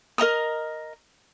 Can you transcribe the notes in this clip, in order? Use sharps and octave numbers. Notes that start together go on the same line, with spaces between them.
A#4 D#5 A#5 D#6